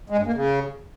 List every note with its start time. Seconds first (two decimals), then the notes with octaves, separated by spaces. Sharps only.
0.10 G#3
0.18 G2
0.26 A#3
0.34 C#3